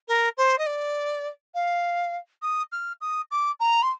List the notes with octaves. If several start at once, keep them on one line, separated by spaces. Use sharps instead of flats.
A#4
C5
D#5
D5
F5
D#6
F6
D#6
D6
A#5
C6